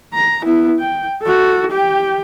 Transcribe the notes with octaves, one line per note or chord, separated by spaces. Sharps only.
A#5
B3 E4
G5
F#4 A4
G4 G5